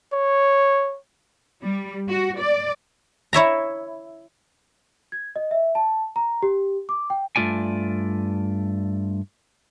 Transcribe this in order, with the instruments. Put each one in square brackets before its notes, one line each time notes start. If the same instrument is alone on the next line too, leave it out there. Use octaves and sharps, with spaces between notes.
[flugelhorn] C#5
[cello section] G3
F#4
D5
[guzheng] E4 C#5 E5 A#5
[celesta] G#6
D#5
E5
A5
A#5
G4
D6
G5
[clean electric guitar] G2 A3 F4 D5 G#5